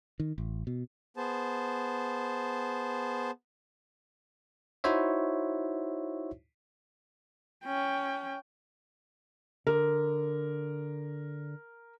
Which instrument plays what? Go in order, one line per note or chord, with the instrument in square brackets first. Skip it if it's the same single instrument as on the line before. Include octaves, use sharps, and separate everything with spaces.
[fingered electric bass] D#3
A1
B2
[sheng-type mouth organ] B3 G#4 C5 A5
[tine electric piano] D#4 E4 F#4 C5 C#5 E5
[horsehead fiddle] C#4 G5
[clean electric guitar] D3 [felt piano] A#4